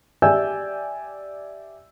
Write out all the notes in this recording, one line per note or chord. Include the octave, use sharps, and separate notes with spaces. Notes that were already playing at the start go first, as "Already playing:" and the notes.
G4 D5 E5 G#5 E6 G6